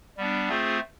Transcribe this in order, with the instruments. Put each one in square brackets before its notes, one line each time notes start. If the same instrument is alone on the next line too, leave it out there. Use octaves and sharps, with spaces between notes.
[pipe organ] G3 B3 D4
A3 C4 F4 G#4 C5